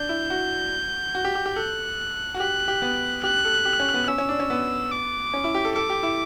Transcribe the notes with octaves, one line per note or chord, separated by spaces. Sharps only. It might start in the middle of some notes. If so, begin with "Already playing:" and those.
Already playing: D4 G6
E4
F#4
F#4
G4
G4
G4
A4 F#6
F#4
G4 F#6
G4
B3
G4 F#6
A4
G4
C#4
B3
C#4 E6
C#4
D4
C#4
B3
D6
C#4
E4
G4
A4
A4 D6
G4
E4